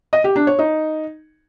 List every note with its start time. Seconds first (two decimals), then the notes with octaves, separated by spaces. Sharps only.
0.13 D#5
0.24 G4
0.36 D4
0.47 C#5
0.59 D#4